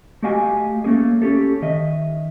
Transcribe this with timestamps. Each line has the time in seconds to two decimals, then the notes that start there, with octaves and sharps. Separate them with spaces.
0.23 A3 F#4 G4 D#5 F5 G#5
0.84 A3 A#3 C#4 G#4
1.22 C#4 G4 A4
1.62 D#3 D#5 E5